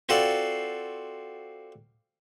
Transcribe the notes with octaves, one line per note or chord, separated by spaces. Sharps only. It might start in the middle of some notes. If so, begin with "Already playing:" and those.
C4 F4 F#4 A4 D5